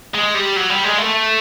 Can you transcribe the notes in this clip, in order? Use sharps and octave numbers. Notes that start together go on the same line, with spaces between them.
G#3
G3
F#3
G3
G#3
A3